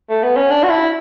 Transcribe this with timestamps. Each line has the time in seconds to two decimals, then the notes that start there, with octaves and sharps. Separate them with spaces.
0.09 A3
0.23 B3
0.36 C#4
0.50 D4
0.63 F#4
0.69 E4